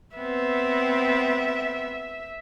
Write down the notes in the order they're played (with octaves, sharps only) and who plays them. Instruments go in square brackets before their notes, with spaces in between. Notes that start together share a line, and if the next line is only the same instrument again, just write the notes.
[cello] B3 C4 [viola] E5